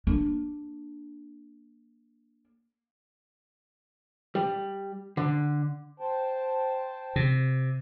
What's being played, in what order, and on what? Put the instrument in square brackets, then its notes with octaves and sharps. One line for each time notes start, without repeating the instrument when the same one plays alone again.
[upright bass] A#3 D4
[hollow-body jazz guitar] G3
D3
[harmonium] C5 G5 A5
[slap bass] C3